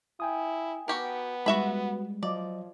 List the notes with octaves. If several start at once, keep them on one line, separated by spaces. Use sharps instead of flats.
E4 G5 G#5 D#6
B3 F#4 G4 A#4
G3 G#3 F#4 E5 B5
F3 F#3 D5 D#5